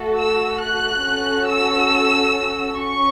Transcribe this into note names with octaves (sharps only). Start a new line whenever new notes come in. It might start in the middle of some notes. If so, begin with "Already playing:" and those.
Already playing: A3 F#4 A4
E6
F#6
C#4 F#4 A4
E6
C#4 C#6